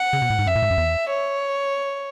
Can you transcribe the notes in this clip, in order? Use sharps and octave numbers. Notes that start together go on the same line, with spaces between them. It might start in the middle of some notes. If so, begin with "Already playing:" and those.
Already playing: F#5
C#3
B2
A2
G#2
F#2 E5
A2
G#2
F#2
E2
C#5